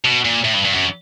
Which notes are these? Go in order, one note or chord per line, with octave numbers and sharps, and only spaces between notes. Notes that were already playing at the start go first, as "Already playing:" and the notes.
B2
A#2
A2
G2
G2
F#2